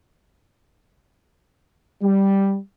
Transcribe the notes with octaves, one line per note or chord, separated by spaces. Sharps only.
G3